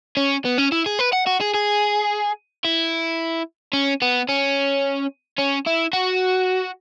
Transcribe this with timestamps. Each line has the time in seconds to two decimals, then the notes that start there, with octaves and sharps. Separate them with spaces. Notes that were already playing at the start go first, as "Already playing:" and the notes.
0.17 C#4
0.45 B3
0.58 C#4
0.72 E4
0.86 G#4
0.99 B4
1.13 F#5
1.27 F#4
1.41 G#4
1.54 G#4
2.65 E4
3.73 C#4
4.02 B3
4.29 C#4
5.38 C#4
5.66 E4
5.93 F#4